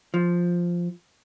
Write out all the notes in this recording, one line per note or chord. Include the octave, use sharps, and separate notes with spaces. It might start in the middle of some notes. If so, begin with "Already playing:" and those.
F3